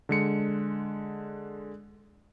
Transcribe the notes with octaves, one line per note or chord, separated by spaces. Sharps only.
D3 G#3 C#7